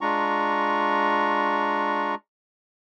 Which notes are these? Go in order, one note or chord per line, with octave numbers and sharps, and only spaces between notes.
G#3 D4 F4 A#5 C#6